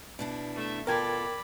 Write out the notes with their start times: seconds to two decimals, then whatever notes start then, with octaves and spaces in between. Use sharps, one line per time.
0.19 B2 D4 E4
0.55 A3 E5
0.87 B2 F4 A4 A#4 D5 G5 B5 G#6